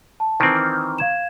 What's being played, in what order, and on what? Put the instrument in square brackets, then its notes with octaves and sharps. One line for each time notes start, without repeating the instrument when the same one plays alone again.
[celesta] A5
[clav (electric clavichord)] D#3 E3 C4
[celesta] D6 F6
F5 G#6 E7